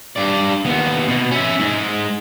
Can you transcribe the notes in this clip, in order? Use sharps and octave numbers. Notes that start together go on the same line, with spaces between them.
G2 D5
D#2 B3
B2
C#4 E5
G#2 G#3